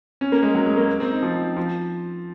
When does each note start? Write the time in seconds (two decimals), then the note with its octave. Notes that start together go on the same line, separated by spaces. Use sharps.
0.21 C#4
0.32 A#3
0.43 G#3
0.55 F#3
0.66 G#3
0.77 A#3
1.00 C4
1.11 D#4
1.23 F3
1.56 F3